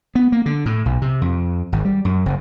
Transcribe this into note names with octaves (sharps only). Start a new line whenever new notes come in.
B3
A#3
D3
A2
B1
C3
F2
G#1
G3
F#2
F#1